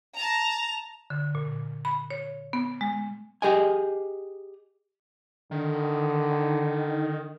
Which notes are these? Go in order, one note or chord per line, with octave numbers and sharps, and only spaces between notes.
A5 A#5 F7
D3
A#2
B5
C#5
B3
G#3
G4 G#4 D#5 G#5
D3 D#3